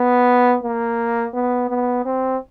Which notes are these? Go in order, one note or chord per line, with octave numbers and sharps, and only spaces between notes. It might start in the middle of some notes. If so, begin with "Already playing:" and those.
Already playing: B3
A#3
B3
B3
C4